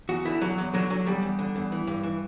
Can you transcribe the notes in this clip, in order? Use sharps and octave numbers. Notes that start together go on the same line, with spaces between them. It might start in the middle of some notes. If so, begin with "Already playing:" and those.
E2 F#4
D3 E4
E2 F#3
E2 F#3
D3 F#3
D3 F#3
E2 G3
E2
D3
E2
E3
G2
E3